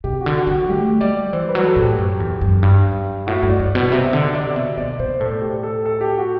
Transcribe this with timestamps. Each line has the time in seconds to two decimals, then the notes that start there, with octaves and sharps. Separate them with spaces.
0.04 C3 G4
0.21 F#4
0.26 D3
0.37 F#4
0.47 D3
0.53 F#4
0.69 A3 G4
1.01 G3 D5
1.33 E3 C5
1.49 B4
1.55 F#3
1.66 A4
1.76 A2
1.82 G4
1.98 F#2
2.20 E2
2.41 F#2
2.63 G2
3.27 A2 F#4
3.43 G2
3.49 D5
3.59 G2
3.75 B2
3.91 C3 E5
4.13 D3 D5
4.34 C3 D5
4.56 B2 E5
4.78 B2 D5
4.99 B2 C5
5.20 A2 A4
5.42 G4
5.63 A4
5.85 A4
6.01 G4
6.18 F#4